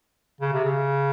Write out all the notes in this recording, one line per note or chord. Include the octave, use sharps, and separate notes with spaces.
C#3
C3
C#3